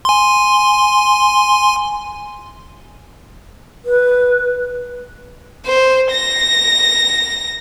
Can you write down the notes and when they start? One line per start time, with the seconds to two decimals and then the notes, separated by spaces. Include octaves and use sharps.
0.05 G#5 C6
3.85 B4
5.67 C5
6.11 A#6